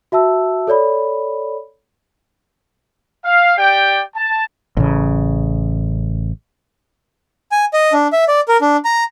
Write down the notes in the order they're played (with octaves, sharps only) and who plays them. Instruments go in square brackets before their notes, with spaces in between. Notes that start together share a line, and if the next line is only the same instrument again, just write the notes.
[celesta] F#4 E5 A5 E6
A4 C#5 D5 B5
[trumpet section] F5
G4 D5 G5
A5
[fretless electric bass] A1 C#3
[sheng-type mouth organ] G#5
D#5
D4
E5
D5
A#4
D4
A#5